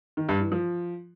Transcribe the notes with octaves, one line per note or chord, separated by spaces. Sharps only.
D#3
G2
E3
F3